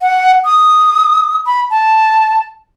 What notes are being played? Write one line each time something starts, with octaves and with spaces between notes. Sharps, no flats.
F#5
D#6
B5
A5